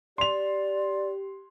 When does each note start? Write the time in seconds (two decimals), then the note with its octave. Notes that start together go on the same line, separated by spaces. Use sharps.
0.18 G4 D5 C6 F7